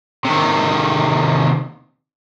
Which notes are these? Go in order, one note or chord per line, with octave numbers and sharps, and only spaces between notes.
C3 D#3